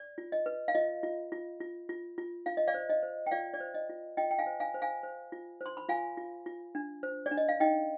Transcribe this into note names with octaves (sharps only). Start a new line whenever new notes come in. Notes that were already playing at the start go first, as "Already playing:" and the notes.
Already playing: D5
F4
D#5
B4
F5
F4 D#5
F4
F4
F4
F4
F4
F4 F5
D#5
D5 F5
C5
D#5
C5
G5
F4 D5 F5
D5
C5
D#5
F4
F4 D#5 G5
G5
F5 G#5
C5
F5 G#5
C5
F5 G#5
C5
F4
C5
C6
B5
F4 F5 G#5
F4
F4
D4
C5
D5
D4
D#5
F5
D#4 D#5 G5